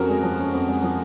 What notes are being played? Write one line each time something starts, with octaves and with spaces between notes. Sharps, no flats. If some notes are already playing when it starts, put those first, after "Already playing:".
Already playing: F2 C#4 F#4 A#4
G#3
F3
C#4
F2
G#3
F3